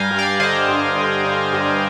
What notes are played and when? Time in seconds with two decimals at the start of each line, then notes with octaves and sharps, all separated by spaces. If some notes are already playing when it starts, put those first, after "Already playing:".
Already playing: G2 G3 F5 G5 G#5 A#5
0.11 G2
0.19 D5 F5
0.40 D3 C5 D#5
0.68 G2
0.96 D3
1.25 D3
1.53 G2